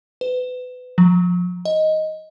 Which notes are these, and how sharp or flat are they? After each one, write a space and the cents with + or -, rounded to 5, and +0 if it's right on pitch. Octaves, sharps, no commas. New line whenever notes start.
B4 +30
F3 +25
D#5 +5